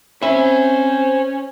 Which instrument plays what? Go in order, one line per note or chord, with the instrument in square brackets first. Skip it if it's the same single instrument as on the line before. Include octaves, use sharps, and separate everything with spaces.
[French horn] C4 [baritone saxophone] C#4 [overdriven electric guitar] C5 B5 [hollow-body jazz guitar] E5